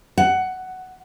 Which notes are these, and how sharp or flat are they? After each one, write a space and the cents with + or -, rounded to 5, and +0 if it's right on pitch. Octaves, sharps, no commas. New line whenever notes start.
F#5 +10